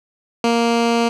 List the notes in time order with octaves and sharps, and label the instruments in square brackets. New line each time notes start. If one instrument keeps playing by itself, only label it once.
[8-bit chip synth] A#3